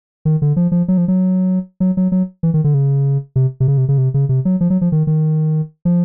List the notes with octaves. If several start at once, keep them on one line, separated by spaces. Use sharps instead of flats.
D#3
D3
F3
F3
F#3
F3
F#3
F#3
F#3
F#3
E3
D#3
D3
C#3
C3
C3
C#3
C3
C#3
C3
C#3
C3
F#3
F3
F#3
F3
D#3
D#3
F3